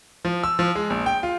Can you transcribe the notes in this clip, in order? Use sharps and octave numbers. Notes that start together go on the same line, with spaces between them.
F3
E6
F3
G#3
A#1
G5
F4